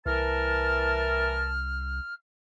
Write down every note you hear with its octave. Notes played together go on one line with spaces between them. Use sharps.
C2 E3 A#4 A5 F6